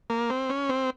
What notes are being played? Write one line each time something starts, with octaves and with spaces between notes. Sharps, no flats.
A#3
C4
C#4
C4